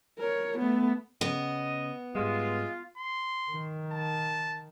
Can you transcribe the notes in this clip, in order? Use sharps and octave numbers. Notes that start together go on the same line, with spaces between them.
A#4 C#5
A3 B3
C#3 B3 D#5
G#2 G3 G#3 F4
C6
D#3
A5